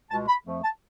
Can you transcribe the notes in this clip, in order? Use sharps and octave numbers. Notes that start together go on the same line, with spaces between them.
C#2 B2 G#3 A5
B5
F2 F3 A3
A5